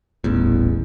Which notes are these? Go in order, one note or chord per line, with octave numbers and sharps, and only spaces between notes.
D#1 A1 E2